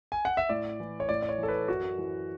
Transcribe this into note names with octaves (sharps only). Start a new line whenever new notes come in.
G#5
F#5
E5
A2 D5
E3
C#5
A2 D5
D5
C#5
E3
A4
B4
F#2 F#4
E3